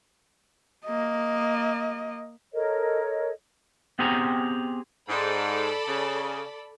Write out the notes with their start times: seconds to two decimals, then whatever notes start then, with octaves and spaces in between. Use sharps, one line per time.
0.85 A#3 D#5
2.53 A4 A#4 C#5 D#5
3.99 B3 C4 G4 G#4 G#5 A#5
5.08 G#2 A4 D5 B5
5.87 C#3